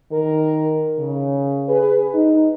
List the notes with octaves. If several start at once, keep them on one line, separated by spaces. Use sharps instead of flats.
D#3 A#4
C#3
G#4 B4
D#4